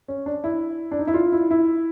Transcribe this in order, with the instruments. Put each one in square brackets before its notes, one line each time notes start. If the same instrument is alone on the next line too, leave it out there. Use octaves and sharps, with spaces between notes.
[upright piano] C#4
D4
E4
D4
D#4
E4
F4
E4
E4